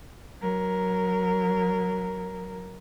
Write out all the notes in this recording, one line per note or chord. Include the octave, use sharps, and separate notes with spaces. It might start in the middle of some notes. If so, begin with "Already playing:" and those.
F#3 A#4